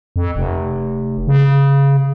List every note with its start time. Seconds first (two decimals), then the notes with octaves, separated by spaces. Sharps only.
0.16 F2
0.36 F1
1.28 C#3